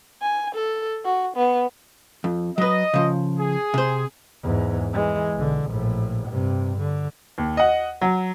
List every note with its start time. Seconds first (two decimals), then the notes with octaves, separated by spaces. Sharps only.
0.22 G#5
0.54 A4
1.05 F#4
1.36 B3
2.24 F2
2.58 F#3 B4 D#5
2.94 C#3 F3
3.40 G#4
3.74 C3 C5
4.43 E2 G#2
4.93 E3 G#3
5.35 B1 D3
5.66 A#1 A2
6.28 G2 C3
6.77 D3
7.38 D#2
7.57 D#5 F#5
8.01 F#3